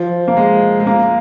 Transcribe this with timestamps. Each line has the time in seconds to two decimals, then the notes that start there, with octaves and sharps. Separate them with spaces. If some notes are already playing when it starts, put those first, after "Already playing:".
Already playing: F3
0.28 A#3
0.37 G#3
0.80 G#3
0.87 A#3